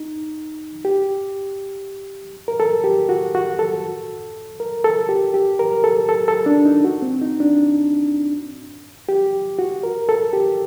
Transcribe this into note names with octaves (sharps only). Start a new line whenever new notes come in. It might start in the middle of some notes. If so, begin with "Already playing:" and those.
Already playing: D#4
G4
A#4
A4
G4
F#4
F#4
A4
A#4
A4
G4
G4
A#4
A4
A4
A4
D4
D#4
F#4
C4
D#4
D4
G4
F#4
A#4
A4
G4